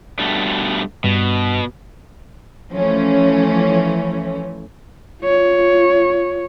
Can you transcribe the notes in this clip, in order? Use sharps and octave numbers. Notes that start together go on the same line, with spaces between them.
G2 B2 A3
G2 B2
E3 F3 A3 C#4
F4 C#5